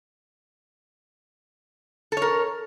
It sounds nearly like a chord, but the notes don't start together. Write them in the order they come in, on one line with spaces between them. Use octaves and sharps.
A4 C#5 A#4